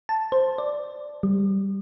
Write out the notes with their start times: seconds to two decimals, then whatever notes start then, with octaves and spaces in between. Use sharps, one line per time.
0.09 A5
0.32 C5
0.58 D5
1.23 G3